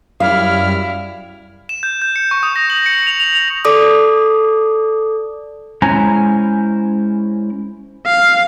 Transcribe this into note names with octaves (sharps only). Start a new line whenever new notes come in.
F#2 G3 E4 F5 F6
E7
G6
G6
C#7
C#6
D#6
A#6
F#7
C#7
F7
F7
F7
A4 D5 D6 D#6
G#3 C#4 E4 C5 G#5 A#5
F5